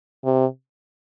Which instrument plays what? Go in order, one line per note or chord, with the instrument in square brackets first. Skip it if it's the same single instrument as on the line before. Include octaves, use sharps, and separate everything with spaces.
[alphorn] C3